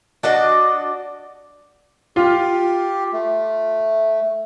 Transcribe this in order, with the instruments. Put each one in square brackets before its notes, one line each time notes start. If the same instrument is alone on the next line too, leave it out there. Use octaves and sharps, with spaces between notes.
[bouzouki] D4 F#4 D5 D#5
[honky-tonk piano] F4 [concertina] G4
[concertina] A3